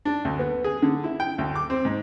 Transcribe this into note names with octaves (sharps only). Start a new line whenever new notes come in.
D4
D2
B3
G#4
D3
E4
G5
D2
D6
C4
G#2